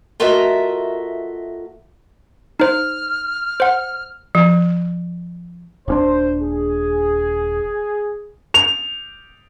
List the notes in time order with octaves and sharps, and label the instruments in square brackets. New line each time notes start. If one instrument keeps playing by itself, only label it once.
[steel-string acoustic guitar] A3 F4 F#4 A#4 D#5 E5
[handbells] D#4 C5 [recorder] F6
[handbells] C5 F#5
[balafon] F3
[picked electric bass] D#1 C#4 D4 [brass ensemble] C5
[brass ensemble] G#4
[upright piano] F7